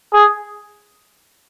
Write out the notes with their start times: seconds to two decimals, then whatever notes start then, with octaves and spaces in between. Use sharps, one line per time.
0.13 G#4